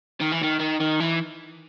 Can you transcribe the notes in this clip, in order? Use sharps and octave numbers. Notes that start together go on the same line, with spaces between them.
D#3
E3
D#3
D#3
D#3
E3